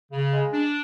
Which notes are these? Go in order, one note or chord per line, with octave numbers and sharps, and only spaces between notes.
C#3
G#3
D4